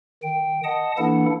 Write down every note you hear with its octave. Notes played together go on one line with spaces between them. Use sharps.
D#3 G5
D#5 F#5 A5 D#6
E3 A#3 D4 E4 A4 F#5